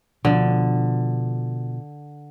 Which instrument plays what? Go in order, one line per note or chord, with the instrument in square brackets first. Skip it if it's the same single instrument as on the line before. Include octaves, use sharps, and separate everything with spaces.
[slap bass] B2 F3 [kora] D3